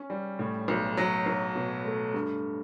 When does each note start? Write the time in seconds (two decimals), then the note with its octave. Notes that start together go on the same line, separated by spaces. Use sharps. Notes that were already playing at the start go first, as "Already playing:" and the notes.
Already playing: C#4
0.10 G3
0.39 A2
0.68 B1
0.97 F#3
1.26 B1
1.55 B2
1.85 A3
2.14 G2